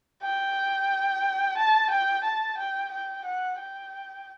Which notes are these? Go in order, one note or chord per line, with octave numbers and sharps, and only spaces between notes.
G5
A5
G5
A5
G5
G5
F#5
G5